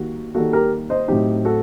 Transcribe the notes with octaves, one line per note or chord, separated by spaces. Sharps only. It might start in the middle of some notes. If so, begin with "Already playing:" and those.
Already playing: D#3 G3 A#3 F#4
D#3 G3 A#3 F#4 A4
G4 A#4
C5 D#5
A2 F#3 C4 D#4 G4
F#4 A4